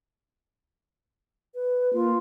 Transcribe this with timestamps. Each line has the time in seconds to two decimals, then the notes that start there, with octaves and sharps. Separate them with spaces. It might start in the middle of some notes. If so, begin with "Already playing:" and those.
1.54 B4
1.93 A#3 F4